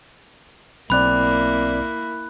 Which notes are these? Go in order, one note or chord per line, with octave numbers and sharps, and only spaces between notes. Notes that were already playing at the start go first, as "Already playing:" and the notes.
B1 A#3 C4 E4 D5 B5 F#6